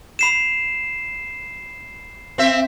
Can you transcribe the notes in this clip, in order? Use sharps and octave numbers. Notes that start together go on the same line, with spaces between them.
B5 C7 E7
C4 E5